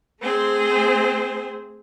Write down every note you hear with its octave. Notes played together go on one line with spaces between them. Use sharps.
A3 C4 G#4 C5